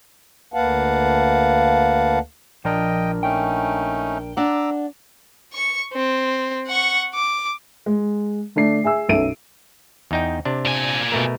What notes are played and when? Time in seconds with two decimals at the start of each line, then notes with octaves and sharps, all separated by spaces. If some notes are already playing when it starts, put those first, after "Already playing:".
0.54 D2 A#3 B4 F5 F#5 A5
2.65 A#1 F3 D4 A#4 D#5 G5
3.23 A3 C#4 D#4 G5
4.37 D4 F#5 A#5 D6 E6
5.53 C#6 C#7
5.93 C4
6.67 F#5 C#6
7.14 D6
7.86 G#3
8.56 D3 A3 D4 C7
8.84 G#4 E5 G#5 E6
9.09 B1 F#2 A4 E5 D7 D#7
10.11 E2 D#4 G5
10.45 C3 D4
10.65 A#2 G#5
11.12 B2 A3 A#4